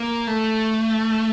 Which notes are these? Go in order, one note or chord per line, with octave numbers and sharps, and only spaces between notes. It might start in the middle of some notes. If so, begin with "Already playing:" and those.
Already playing: A#3
A3